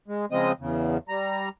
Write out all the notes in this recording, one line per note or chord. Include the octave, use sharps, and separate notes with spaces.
G#3
C#3 F3 G#3 C4 D#5 D#6
E2 C#3
G3 A#5